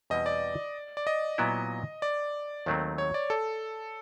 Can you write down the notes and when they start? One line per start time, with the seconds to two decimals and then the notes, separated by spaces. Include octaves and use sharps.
0.10 E2 B2 G3 C4 E4 D#5
0.26 D5
0.97 D5
1.07 D#5
1.38 A#2 F#3 B3 E4
2.02 D5
2.66 D#2 D#3 F#3 A3 C4
2.98 C#5
3.14 D5
3.30 A4